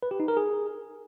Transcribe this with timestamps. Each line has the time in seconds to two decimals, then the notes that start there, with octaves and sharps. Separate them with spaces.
0.03 B4
0.11 G4
0.20 D#4
0.28 A#4
0.37 G#4